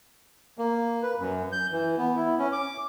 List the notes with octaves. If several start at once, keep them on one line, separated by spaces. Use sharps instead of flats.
A#3
B4
F#2
G6
E3
B3
E4
C#4
D6